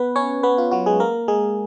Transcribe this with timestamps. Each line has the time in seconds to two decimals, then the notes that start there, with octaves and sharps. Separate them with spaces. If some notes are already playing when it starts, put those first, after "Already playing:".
Already playing: B3 B4
0.16 C#4 C#5
0.43 B3 B4
0.58 F4
0.71 F#3 F#4
0.86 G#3 G#4
1.00 A#3 A#4
1.28 G#3 G#4